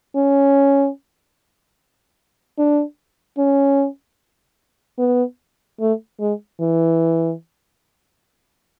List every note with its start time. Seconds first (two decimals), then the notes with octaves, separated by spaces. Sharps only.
0.16 C#4
2.58 D4
3.38 C#4
4.99 B3
5.80 A3
6.20 G#3
6.61 E3